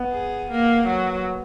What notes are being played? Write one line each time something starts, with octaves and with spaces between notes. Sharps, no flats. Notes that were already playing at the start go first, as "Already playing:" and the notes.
Already playing: B3
G#4
A#3
F#3